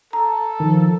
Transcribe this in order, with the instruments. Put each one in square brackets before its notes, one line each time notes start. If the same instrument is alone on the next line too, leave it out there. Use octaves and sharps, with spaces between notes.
[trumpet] A4 [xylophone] A#5
[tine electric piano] D#3 [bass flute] F3